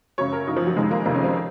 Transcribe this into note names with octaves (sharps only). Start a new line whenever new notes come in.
F#2 C#3 C#5
A#4
F#2 C#3 D#4
F3
F#3
F2 C3 D#3 G#3
A#3
F2 C3 D#3 A#3
C#4
C4